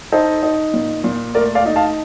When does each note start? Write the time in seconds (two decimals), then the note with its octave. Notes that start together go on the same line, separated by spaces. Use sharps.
0.12 D#4 A4 C5
0.43 D#4
0.74 A#2
1.04 A#2
1.35 A3 A#4 D5
1.55 D5 F5
1.66 D#4
1.76 F5 A5